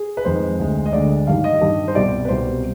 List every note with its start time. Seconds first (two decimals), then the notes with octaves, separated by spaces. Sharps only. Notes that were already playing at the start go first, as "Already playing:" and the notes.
Already playing: G#4
0.17 B4
0.25 F2 D#3 G#3 C5
0.59 D2 D3 G#3
0.86 D#5
0.93 D2 D3 G#3 D5
1.27 G2 D#3 G3 F5
1.44 D#5
1.61 G2 D#3 G3
1.88 C5
1.95 C2 B2 G3 D5
2.25 B4
2.29 C2 B2 G3 C5